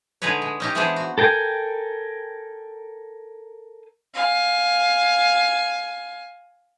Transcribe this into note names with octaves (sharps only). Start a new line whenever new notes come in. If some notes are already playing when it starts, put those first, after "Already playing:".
D3 G#3 D#4 G#4 B4 C#5
G#3
C#4 D#4 G4
E3 G#3 B3 D4 G#4 C5
F#4
A4 A#4 G5 G#5
F5 G#5